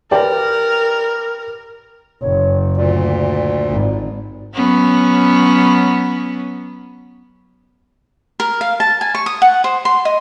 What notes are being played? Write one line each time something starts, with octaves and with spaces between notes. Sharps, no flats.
G4 A#4 B4 D5 G5
F#1 C#5
D2 A#2 D5
G#1
F#3 B3 C#4
A#4
F5
A5
G#5
C#6
D#6
F#5
C5
C6
D#5